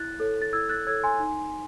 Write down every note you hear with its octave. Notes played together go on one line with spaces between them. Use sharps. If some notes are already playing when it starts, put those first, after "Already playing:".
Already playing: E4 F#6 A6
A4 C#5
A6
E4 E6 G#6
F#6 A6
A4 C#5 E6 G#6
G#5 C6
D#4